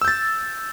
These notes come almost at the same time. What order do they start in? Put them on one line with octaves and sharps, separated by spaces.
E6 G6 A6